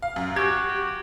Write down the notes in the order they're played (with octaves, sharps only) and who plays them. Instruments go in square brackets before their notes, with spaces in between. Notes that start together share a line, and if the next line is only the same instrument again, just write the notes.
[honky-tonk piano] F5
F#2
[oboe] F#4 [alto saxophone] G4 [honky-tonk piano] G#6
[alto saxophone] G4